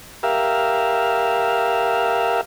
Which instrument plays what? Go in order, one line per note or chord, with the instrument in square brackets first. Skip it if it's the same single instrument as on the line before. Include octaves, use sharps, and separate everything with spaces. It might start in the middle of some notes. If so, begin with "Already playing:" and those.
[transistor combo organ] G4 A#4 E5 F5